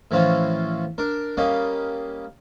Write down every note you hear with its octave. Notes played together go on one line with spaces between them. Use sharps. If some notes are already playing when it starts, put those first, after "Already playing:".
A2 E3 F3 C#4 F4 F#4
D4 A#4
G3 A#3 C#4 D#5 F5